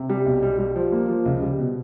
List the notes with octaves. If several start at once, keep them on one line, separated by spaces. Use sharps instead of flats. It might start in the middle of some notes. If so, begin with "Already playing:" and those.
Already playing: C3
G3
B1
G3
G3
F3
A#3
F3
C#2
G3
B2